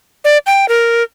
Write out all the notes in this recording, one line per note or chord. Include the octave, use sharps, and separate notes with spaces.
D5
G5
A#4